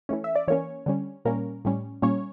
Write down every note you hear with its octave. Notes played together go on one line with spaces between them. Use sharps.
E3 A3 C#4
E5
D5
E3 A#3 C#4 C#5
D3 G3 C#4
A#2 G3 A#3 C#4 A#4
A2 G3 C#4
A#2 G3 A#3 C#4 C#5